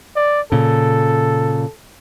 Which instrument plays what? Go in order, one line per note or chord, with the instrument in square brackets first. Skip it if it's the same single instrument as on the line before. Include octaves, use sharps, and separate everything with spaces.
[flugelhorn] D5
[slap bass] A#2 C#3 [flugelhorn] A4